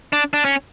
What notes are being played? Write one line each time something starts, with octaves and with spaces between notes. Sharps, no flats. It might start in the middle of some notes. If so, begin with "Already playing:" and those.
D4
D4
C#4